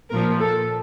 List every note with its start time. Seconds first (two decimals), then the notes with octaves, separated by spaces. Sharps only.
0.11 A#2 A#4
0.15 F3
0.41 A4